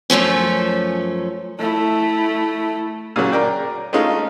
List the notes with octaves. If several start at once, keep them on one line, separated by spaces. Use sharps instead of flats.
F#2 F3 A3 C#4
A3 E4
A#2 C#3 F#3
A#4 D5 G5
G#3 A3 C#4 D#4 F4